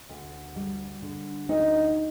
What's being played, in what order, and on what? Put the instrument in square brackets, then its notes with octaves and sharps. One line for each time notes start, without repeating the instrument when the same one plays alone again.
[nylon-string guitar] D2
G3
D3
D2 D#4 D#5